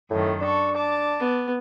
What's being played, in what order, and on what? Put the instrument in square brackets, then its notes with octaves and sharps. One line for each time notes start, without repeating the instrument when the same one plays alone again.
[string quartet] F#2 D#3 A3 [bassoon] A2
[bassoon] D4 [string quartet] A4 C#6
[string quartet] A5 D6
[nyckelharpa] B3